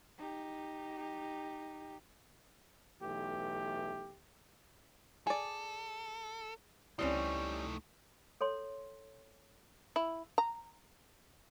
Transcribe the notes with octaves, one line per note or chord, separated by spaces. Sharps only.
D#4 G4
B1 E3 A3 G4
G#4 A4 D5
C#2 G3 A3 C4 C#4 D#4 E4
A4 C#5 C6
E4
A#5